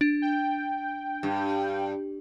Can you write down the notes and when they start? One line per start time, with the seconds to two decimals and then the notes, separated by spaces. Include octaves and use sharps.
0.01 D4
0.22 G5
1.23 G2